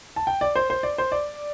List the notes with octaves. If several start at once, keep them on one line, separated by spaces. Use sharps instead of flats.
A5
G5
D5
C5
C5
D5
C5
D5